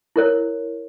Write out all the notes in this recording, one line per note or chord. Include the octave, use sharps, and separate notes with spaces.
E4 A#4 C#5